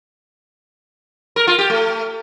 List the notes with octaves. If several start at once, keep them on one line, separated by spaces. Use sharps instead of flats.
A#4
F4
G4
A3